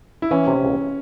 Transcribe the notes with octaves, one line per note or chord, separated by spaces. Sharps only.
E4
E3 C#4
C3
C#2